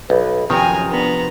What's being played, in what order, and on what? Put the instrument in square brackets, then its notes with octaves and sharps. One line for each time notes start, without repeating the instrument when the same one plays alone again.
[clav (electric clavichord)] B1 [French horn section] B4
[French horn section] F#2 [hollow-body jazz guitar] C3 F3 C4 [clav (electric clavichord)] D#3 [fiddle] G#5 A#5
[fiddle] B3 A#5 [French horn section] D4